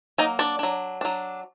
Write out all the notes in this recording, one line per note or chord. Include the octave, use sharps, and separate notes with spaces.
F#3 A#3 D#4 D#5
D4 D5
F#3 D4
F#3 D4